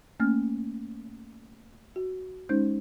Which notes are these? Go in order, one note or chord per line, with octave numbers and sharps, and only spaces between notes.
A3 A#3 C#4 F6
F#4
G#3 C#4 D#4 C5 G6